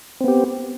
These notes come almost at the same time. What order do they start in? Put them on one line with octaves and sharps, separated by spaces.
C4 B3 G4